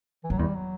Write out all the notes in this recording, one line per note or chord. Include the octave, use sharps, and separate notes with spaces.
E3
F#2 F#3
E2 G3
F#3